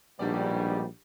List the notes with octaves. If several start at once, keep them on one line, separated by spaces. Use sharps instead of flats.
A#1 G#2 B2 G3 D4 G4 D5